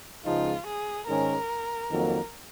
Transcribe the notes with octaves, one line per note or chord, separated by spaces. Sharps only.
C#2 C#3 F3 G#3 D#4 F4
G#4
G#2 D#3 G#3 C#4 A#4
F2 D#3 F#3 A#3